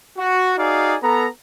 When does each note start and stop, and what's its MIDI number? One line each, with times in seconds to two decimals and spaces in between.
0.18 0.55 66
0.57 0.96 63
0.57 0.96 66
0.57 0.96 68
0.57 0.96 74
0.57 0.96 77
1.02 1.27 59
1.02 1.27 69
1.02 1.27 82